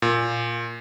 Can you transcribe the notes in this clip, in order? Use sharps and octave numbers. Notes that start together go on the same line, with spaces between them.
A#2